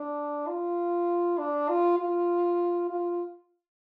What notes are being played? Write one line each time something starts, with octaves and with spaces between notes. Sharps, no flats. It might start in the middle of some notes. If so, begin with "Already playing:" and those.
Already playing: D4
F4
D4
F4
F4
F4